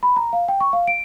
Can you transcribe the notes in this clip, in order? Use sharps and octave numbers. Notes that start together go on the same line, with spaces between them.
B5
A#5
F5
G5
C#6
F5
D7